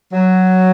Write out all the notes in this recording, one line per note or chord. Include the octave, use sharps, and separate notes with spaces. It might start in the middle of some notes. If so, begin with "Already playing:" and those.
F#3